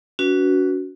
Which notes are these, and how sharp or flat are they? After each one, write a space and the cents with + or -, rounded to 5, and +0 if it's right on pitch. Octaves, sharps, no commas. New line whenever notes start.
C#4 +45 F#4 +0 B4 -10